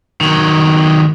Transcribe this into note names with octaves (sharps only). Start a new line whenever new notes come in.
D#3 F#3